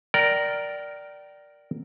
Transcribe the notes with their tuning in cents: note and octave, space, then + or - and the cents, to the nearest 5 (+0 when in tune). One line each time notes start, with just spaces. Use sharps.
A#4 +0 D5 +0 G5 -30